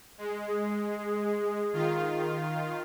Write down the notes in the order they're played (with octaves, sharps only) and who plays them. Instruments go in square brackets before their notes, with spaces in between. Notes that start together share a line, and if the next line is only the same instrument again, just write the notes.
[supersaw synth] G#3
[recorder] G#4
[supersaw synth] D#3 F4